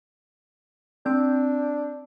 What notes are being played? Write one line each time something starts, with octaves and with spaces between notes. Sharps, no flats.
C4 D4 G6